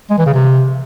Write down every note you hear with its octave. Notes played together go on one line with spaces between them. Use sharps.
G#3
E3
C#3
C3